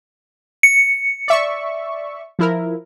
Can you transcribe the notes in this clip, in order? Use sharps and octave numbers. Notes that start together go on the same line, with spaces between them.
C#7
D5 E5 C#6
F3 E4 A#4